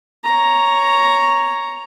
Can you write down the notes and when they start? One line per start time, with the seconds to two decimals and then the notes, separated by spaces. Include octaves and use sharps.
0.24 C#5 A#5